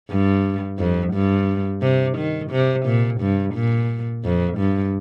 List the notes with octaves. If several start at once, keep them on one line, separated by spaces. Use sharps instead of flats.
G2
F2
G2
C3
D#3
C3
A#2
G2
A#2
F2
G2